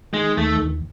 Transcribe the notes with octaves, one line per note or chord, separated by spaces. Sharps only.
D#3 G#3
D#2 A3
D#2